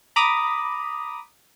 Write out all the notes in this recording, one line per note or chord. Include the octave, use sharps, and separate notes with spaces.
A#5 B5 D6 D#6